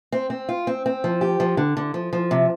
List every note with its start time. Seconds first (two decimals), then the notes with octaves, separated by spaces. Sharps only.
0.12 C4
0.30 C4
0.49 F4
0.67 C4
0.86 C4
1.04 F3
1.21 G4
1.40 F3
1.57 D3
1.77 D3
1.94 F3
2.13 F3
2.31 C3